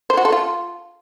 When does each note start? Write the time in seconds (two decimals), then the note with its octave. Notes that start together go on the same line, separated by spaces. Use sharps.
0.10 C5
0.17 F#4
0.25 A4
0.32 F4